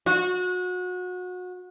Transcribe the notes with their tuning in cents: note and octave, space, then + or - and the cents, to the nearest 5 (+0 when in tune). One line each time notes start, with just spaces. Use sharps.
F#4 -30